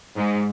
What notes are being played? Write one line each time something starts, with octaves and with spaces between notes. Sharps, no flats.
G#2